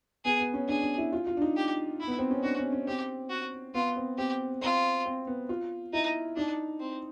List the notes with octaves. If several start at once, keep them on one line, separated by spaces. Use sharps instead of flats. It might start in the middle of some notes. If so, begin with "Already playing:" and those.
B3 G#4
B3
C#4
D4 G#4
D4
E4
F4
F4
D4
D#4
G4
E4
B3
C4
C#4
D4 F#4
C#4
C#4
C4 G4
F#4
B3 F4
C4
C4 G4
C4 F4
C4
B3
F4
D#4 E4
D4 D#4
C4